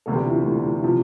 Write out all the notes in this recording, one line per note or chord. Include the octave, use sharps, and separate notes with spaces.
E1 D2 C3 A4
G4
F4
E4
D4
A3
C3 F3